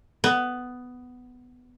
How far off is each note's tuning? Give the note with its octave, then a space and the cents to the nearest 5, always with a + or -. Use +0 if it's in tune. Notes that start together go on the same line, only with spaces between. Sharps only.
B3 +10